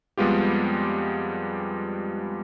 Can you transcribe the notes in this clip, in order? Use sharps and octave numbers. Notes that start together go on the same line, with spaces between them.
F2 G3 G#3 B3 F4 G4